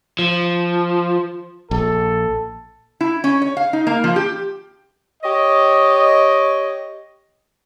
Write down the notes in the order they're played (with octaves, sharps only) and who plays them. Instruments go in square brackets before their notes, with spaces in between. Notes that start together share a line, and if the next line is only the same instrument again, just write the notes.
[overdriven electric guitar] F3
[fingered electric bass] A#1 [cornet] A4
[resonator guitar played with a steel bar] E4
C#4
C#5
F5
D#4
A#3
F3
G4
[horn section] G4 C#5 D#5